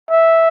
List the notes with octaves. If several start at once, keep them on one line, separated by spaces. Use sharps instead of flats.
E5